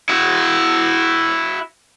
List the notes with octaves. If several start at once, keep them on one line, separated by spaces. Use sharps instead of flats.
E4 F#4